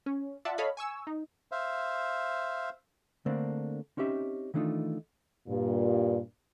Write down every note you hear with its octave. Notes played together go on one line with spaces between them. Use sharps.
C#4
F4 D5 E5 F#5 A5
A4 C#5 D#5 F5 B5
G#5 C#6 E6
D#4
C5 E5 F5
D3 A3 A#3 C4 D4
C4 C#4 D#4 G4 E5
D#3 E3 A3 D4 D#4 F4
G2 A#2